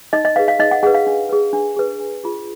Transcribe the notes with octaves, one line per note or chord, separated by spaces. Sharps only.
D#4 D#5
D#5
G#4 B4 F5
F5
D#4 D#5
F#5
G#4 B4 F#5
F5
D4
G#4 B4
D4
G#4 B4
D4
F4 G#4